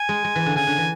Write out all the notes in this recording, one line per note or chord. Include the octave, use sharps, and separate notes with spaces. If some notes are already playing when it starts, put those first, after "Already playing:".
Already playing: G#5
G#3
G#3
E3
D3
C#3 G#5
D3
E3